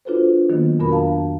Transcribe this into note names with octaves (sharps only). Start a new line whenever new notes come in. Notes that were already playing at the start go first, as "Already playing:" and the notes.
D4 F4 F#4 A4 B4 C5
D#3 F#3 A#3 B3
F2 B2 D4 F#4 A#4 B5
F5 A5 A#5
F2